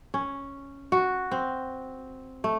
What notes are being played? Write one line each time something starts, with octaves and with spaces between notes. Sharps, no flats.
C#4
F#4
C4
A3